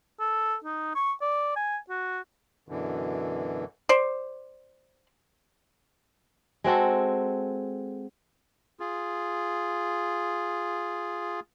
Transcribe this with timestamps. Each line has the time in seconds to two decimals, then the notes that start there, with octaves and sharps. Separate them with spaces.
0.20 A4
0.64 D#4
0.95 C#6
1.22 D5
1.56 G#5
1.89 F#4
2.69 F#2 B2 D3 E3
3.89 C5 D5
6.64 G#3 C4 F#4 A4
8.80 F4 G#4